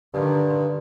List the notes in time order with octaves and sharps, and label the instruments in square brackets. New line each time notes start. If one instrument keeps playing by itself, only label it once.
[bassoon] G2 [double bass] D3 D#3